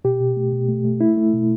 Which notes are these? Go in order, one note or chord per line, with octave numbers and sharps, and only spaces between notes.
B2 G4
B2
A3
B2
A3
A3
A3 E4
A3
B2